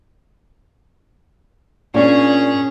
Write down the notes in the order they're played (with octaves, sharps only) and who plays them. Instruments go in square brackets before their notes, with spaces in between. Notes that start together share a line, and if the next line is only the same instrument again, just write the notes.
[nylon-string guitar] A#2 A#3 D4 [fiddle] C#4 G#4